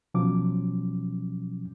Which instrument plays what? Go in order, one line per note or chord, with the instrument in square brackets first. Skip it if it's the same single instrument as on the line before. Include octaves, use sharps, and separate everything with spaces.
[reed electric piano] B2 F3 F#3 C#4 D6